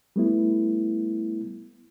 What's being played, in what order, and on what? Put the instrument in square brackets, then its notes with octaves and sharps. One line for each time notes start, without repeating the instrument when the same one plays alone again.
[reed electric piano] G3 A3 B3 E4